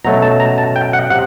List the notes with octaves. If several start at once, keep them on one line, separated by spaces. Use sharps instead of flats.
B2 F#3 A3 C#4 A#5
A5
A#5
A5
G5
F#5
C3 F#5